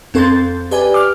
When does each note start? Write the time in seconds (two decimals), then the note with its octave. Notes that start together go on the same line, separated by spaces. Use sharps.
0.14 F2 C4 A4 C6 G6 A6
0.71 G4 B4 D5 G#5
0.94 D6 F6